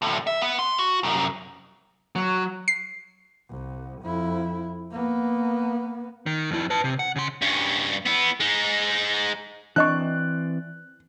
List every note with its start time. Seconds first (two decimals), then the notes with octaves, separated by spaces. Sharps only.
0.02 D2 A2
0.27 E5
0.41 B3
0.59 C6
0.79 F#4
1.03 C2 F#2
2.16 F#3
2.68 C7
3.49 C2
4.02 F2 E4
4.91 A#3 B3
6.26 D#3
6.51 F2 E4
6.70 B4 A5
6.84 C3
6.99 F#5
7.16 C#3 C6
7.42 G2 C#4
8.06 B3 E4
8.40 G#3 D#4
9.76 E3 C4 D4 D5 D#5 C#6 F#6